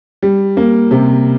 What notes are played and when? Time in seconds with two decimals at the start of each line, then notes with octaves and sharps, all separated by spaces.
0.22 G3
0.57 A#3
0.91 C3